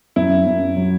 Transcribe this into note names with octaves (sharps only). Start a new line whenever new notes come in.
F#2 E4
F#2
F#3